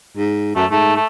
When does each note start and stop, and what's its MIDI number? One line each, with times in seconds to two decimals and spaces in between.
0.17 0.51 44
0.55 0.65 42
0.55 0.65 57
0.71 0.97 44
0.71 0.94 57
0.96 1.06 57